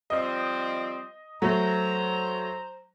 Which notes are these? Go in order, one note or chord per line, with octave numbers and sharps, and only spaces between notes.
F3 G3 C4 D#5
F#3 A3 C5 A#5